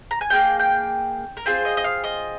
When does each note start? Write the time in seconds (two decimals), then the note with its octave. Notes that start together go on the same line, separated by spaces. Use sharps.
0.11 A#5
0.21 G#5
0.30 A#3 F4 G#4 G5
0.60 G5
1.37 A#4
1.46 C4 F4 G#4 C5
1.65 D#5
1.77 D#5
1.84 F5
2.04 D#5